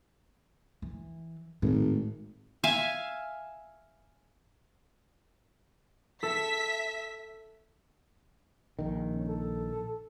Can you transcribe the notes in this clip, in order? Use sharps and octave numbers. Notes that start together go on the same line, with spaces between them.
E3
G#1 A2
E5 F5 G#5
A4 E5 B6
A#1 D#3
C#4
A4